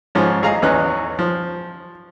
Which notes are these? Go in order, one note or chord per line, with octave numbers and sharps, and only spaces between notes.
G#2 F3 C#4
A1 G#4 D#5 F5 A#5
A1 E2 C#4 D#4 B4 F#6
F3